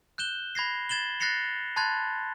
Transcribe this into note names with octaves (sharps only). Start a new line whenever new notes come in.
F#6 G6 E7 G7
B5 G#6 A#6 C7
G#6 A6 E7 F#7 G7
F#6 A6 A#6 C7 C#7 F7
A5 B5 C6 F#6 G#6 A6